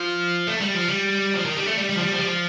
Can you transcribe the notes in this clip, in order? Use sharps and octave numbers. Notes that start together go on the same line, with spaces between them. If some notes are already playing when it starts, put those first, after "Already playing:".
Already playing: F3
A3
G3
F3
G3
F3
D#3
G3
A3
G3
G3
F3
G3
F3
G3
F3